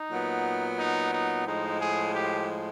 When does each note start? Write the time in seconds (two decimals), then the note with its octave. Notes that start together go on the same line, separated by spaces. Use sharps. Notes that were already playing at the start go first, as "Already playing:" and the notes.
Already playing: D#4
0.09 A#2 F#3 B3
0.78 D#4
1.12 D#4
1.46 A2 F3 G#3 D#4
1.80 G#4
2.14 G4